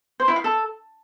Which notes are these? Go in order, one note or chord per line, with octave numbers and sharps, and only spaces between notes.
C5
E4
F5
A4